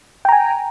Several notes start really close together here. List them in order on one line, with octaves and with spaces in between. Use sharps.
G5 A#5 G#5